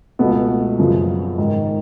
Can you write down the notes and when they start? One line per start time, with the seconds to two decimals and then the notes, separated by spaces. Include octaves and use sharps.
0.19 C#2 B2 A3 B3
0.78 F#2 C#3 F3
1.38 G#2 D#3